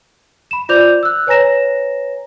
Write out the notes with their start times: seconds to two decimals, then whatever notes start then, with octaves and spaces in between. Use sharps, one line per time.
0.51 B5 E7
0.69 F4 C5 D5 D6 G6 F7
1.03 E6 F#6
1.27 B4 C#5 G#5 A#5 A#6 E7